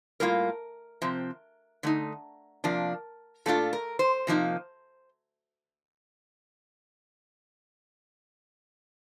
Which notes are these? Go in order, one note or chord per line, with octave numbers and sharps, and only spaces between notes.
A2 G3 A#3 F4 A#4
C3 F3 C4
D3 A3 D#4
C3 F3 A#3 D4
A#2 A3 D4 F4 A4
A#4
C5
C3 F3 A#3 D#4